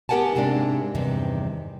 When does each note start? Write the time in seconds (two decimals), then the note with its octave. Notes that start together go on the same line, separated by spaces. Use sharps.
0.09 B3 G4 A#4 F#5 G#5 A5
0.35 G#2 C3 G#3 A#3 D4
0.95 E2 G2 C3 D#3